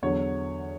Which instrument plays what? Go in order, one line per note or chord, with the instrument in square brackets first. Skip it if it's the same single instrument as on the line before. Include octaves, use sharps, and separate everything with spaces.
[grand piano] E2 D3 F#3 C#5